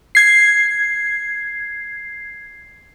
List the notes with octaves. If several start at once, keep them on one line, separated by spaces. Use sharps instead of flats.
G#6 C7